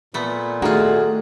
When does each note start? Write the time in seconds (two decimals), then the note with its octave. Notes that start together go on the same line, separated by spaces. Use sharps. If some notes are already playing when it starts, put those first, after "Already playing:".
0.14 A#2 A3 B3
0.62 D#3 A3 F4 F#4 G#4